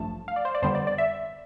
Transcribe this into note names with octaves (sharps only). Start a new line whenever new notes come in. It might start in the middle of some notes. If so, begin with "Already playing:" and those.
Already playing: A1 G2 F3 A3 A5
F5
D5
C5
D5
F2 D3 G3 B3 C5
D5
D5
E5